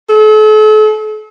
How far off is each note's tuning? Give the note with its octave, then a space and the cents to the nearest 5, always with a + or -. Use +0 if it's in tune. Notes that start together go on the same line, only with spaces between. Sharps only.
A4 -40